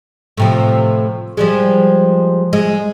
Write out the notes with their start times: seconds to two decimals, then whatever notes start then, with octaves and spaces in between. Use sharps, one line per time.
0.37 A2 C3 F3
1.37 F3 G3 G#3
2.53 G#3